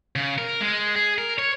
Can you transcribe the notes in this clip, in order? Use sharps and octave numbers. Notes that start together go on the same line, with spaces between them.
C#3
A#4
G#3
G#4
A#4
C#5